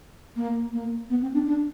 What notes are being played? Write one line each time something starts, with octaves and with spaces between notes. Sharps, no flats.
A#3
A#3
B3
C4
D4
D4